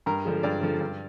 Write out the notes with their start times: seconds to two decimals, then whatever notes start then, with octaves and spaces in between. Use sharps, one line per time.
0.06 G2 A#4
0.25 D3 F3 G#3
0.43 G2 D5
0.62 D3 F3 G#3
0.81 G2